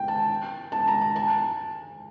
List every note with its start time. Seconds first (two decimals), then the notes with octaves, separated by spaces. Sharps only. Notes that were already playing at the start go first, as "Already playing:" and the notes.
Already playing: G5
0.08 A5
0.72 A5
0.87 A#5
1.01 A5
1.16 A5